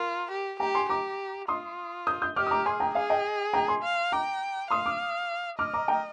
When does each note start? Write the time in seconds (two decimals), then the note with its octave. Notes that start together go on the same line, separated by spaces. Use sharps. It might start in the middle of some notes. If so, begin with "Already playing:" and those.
Already playing: F4 A#4
0.31 G4
0.60 G4 G5 A#5
0.75 G#5 C6
0.89 G4 A#5 D6
1.48 F4 C6 D#6
2.07 D#6 G6
2.22 D#6 G6
2.36 G4 D6 F6
2.47 D#6
2.51 A#5 D6
2.66 G#4 G#5 C6
2.80 G5 A#5
2.95 G#4 F5 G#5
3.10 D#5 G5
3.54 G5 A#5
3.68 G#5 C6
3.83 F5
4.12 G5 A#5 D6
4.71 F5 C6 D#6
4.86 D6 F6
5.59 D#5 D6 F6
5.74 A#5 D6
5.88 G5 A#5